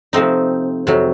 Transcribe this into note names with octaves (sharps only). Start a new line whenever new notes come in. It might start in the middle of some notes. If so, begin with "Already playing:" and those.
C3 F3 A3 C4 D#4
F2 C3 F#3